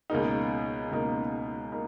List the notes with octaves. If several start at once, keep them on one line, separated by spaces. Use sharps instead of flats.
C#2 B2 A#3 D#4
C#2 B2 A#3 D#4
A#3 D#4